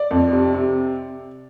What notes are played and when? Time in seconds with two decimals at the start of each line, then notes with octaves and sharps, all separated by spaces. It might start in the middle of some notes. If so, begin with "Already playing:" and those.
Already playing: D5
0.11 F2
0.32 C3
0.54 C3